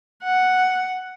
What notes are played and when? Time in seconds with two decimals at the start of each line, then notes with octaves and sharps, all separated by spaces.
0.23 F#5